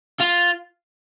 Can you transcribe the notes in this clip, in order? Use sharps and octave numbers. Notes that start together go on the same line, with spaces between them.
F4